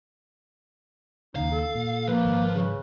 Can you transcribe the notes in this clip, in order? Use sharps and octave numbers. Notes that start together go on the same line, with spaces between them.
D#2 C#3 D#4 F5
A4
A#2
F3 A#3 B4
G#1
C#3